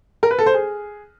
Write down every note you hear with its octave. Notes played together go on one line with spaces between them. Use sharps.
A#4
B4
A4
C5
G#4